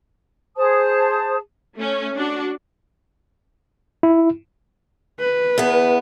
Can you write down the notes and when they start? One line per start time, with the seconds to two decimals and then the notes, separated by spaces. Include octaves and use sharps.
0.56 G#4 C5 A5 D#6
1.77 A3 C#4
2.16 D4 F#4
4.03 E4
5.20 B4
5.58 E2 B3